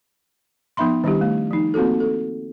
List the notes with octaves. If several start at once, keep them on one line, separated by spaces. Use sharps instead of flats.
F3 B3 D#4 E5 B5 C6
D#3 G3 D4 E4 G4
A3
F3 D#4
A#3 C4 F4 F#4 A4
A4